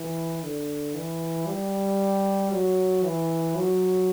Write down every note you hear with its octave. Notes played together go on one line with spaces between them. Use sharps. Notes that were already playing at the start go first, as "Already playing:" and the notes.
Already playing: E3
D3
E3
G3
F#3
E3
F#3